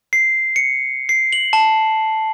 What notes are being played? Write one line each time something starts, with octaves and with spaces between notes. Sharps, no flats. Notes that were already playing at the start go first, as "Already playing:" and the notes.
C7
C#7
C7
F#7
A5